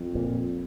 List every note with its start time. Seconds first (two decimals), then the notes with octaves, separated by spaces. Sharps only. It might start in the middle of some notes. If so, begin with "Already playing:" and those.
Already playing: F2
0.15 A#2